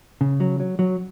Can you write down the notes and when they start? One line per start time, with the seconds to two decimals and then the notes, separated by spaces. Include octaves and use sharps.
0.21 C#3
0.40 F#3
0.60 F#3
0.79 F#3